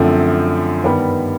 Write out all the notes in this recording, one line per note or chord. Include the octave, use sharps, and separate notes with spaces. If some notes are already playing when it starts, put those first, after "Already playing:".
Already playing: F#2 D3 F3 A3 C4
G2 D#3 G3 B3